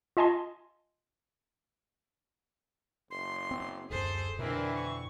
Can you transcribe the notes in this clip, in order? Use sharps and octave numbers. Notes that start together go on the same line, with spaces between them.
F4 D#5 G#5 A5 C6
F#1 C6
C4
D1 F#2 G#4 A4 C5
F2 B2 D3 E3 C4 E4 A#4
C#6